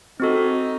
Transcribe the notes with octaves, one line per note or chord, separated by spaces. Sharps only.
C4 D#4 F#4 A4